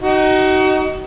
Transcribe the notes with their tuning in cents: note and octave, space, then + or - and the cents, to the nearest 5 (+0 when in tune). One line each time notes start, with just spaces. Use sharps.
D#4 +0 F#4 +35